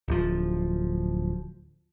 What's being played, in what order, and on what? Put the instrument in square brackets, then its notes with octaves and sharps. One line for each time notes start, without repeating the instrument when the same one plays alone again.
[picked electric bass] D1 F3